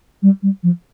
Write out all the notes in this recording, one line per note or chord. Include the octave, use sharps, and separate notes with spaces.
G3
G3
F3